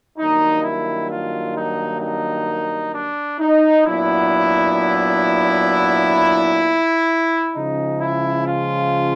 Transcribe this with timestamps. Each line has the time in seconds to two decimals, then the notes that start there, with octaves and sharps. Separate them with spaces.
0.17 G2 D#3 F#3 A#3 D#4
0.63 E4
1.10 F4
1.55 D#4
2.01 D#4
2.94 D4
3.40 D#4
3.86 A#2 F#3 B3 D4 E4
7.55 C#3 F3 G#3 C#4 D#4
8.01 E4
8.47 F4